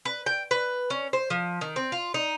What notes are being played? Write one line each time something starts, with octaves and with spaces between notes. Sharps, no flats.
B4
G5
B4
C#4
C5
F3
D#3
C4
F4
D#4